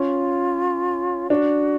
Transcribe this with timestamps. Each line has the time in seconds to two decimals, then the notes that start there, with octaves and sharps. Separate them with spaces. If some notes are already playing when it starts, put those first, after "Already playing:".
Already playing: C#4 F4
1.30 D4 F#4